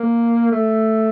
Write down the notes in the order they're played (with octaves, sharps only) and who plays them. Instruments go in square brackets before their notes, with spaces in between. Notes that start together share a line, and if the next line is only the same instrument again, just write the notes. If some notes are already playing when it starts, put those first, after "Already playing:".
Already playing: [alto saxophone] A#3
A3